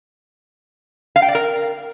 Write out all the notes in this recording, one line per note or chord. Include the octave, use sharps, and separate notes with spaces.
F5
G5
D5
A#4